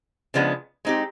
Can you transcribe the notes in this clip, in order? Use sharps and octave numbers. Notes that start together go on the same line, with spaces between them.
C#3 F3 G#3 B3 D4
G#3 C4 D#4 G4